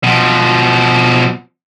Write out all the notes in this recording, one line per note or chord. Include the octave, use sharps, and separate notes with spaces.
B2 F3